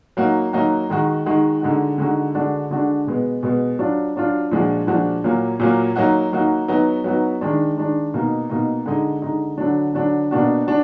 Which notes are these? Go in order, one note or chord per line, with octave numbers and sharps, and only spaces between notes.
F#3 A#3 D#4 F#4
F#3 A#3 D#4 F#4
D#3 G#3 D#4 F#4
D#3 G#3 D#4 F#4
D3 G#3 D#4 F#4
D3 G#3 D#4 F#4
D3 G#3 D4 F#4
D3 G#3 D4 F#4
B2 G#3 B3
B2 G#3 B3
F#3 D4 F4
F#3 D4 F4
A#2 F3 G#3 D4 F#4
A#2 F3 G#3 D4 F#4
A#2 F#3 A#3
A#2 F#3 A#3
F#3 A#3 D#4 F#4
F#3 A#3 D#4 F#4
F#3 B3 D#4 F#4
F#3 B3 D#4 F#4
D#3 G#3 D4
D#3 G#3 D4
B2 A#3 D#4
B2 A#3 D#4
D3 G#3 D#4
D3 G#3 D#4
D3 F#3 D4
D3 F#3 D4
B2 A#3 D4 F#4
D4 F#4